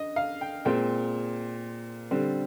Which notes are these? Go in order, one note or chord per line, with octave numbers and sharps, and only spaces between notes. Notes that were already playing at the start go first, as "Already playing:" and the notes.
Already playing: D3 D#5
F5
G5
A#2 G#3 C4 G5
D3 G3 C4